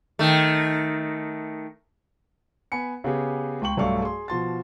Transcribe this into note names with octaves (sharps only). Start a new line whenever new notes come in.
D#3 A3
B3 G#5 B5 C#7
C#3 B3 G4 G#4
C#2 G5 C#6 F#7
B1 G2 A3 D5 F5 C#6
G#4 C6
B2 F3 C6 A6